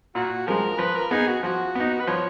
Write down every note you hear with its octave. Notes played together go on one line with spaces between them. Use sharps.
A#2 F#4
F3 G#3 A#4
F3 B4
A#4
B3 D#4 G#4
F#4
F3 F#4
B3 D#4
B4
F3 C#5